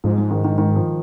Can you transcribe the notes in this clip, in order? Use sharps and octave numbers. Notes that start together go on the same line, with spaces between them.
G#2 F3
G#3
D#3
D#3
D#3
F3